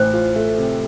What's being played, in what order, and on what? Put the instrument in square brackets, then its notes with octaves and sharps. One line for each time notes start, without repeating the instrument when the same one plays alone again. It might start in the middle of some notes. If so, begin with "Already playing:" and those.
Already playing: [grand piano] A1 [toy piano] C5
[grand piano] F4
A3
C3